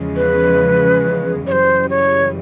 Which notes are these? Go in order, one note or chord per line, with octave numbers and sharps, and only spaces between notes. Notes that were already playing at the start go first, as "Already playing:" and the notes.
Already playing: E2 C#3 F3 G#3
B4
F#2 C#3 E3 G3 C5 C#5
C#5